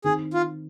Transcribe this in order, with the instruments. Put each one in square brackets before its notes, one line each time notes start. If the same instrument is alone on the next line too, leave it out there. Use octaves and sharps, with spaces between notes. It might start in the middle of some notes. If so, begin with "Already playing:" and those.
[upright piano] D#3 C4 D#4 [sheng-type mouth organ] G#4
[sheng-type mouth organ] F4